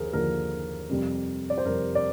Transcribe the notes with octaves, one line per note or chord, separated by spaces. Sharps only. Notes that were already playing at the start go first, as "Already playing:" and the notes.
Already playing: D#2 D3 F3 G#4 A#4 C5
D#2 D3 F3 A#4
F2 C3 G3
D5
C5
F2 C3 G3 A#4
D5